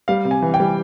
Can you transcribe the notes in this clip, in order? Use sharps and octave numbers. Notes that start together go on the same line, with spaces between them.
G3 F5
C3
G#5
E3
G5
G3